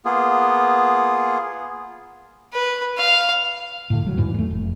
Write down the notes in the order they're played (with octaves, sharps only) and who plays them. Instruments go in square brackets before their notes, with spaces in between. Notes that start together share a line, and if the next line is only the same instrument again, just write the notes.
[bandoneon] A#3 B3 F4 G#4
[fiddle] B4
F5
[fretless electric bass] A2 D3
D#1 F#3
E2 G#2 E3
G#3 A3
F1